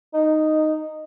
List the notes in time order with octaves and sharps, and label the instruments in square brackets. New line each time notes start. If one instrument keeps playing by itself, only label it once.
[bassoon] D#4